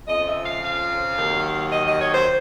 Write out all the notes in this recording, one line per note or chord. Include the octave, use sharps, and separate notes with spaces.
F2 C#3 F3 D#5
E5
F5
F5
D#2 D#3 F#3
D#5
D#5
C#5
C5